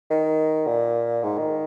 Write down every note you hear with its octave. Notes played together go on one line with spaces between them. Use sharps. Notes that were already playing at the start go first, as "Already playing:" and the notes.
D#3
A#2
G#2
D#3